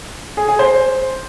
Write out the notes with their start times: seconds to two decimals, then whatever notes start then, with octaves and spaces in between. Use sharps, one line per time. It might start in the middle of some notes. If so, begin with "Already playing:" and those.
0.37 G#4
0.48 G#4
0.59 C5